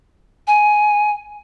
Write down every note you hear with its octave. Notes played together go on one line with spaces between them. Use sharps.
G#5